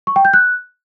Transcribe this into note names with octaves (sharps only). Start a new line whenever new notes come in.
C#6
G5
G6
F#6